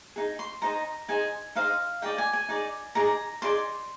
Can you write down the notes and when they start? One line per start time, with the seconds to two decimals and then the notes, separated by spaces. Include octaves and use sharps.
0.16 D#4 G#4
0.39 C6
0.62 D#4 G#4 C5 D#5 A#5
1.08 D#4 G#4 C5 D#5 G#5
1.55 D#4 G#4 C5 D#5 F5
2.02 D#4 G#4 D5 G5
2.18 G#5
2.33 G#5
2.49 D#4 G#4 D5
2.95 D#4 G#4 D5 A#5
3.42 D#4 G#4 D5 C6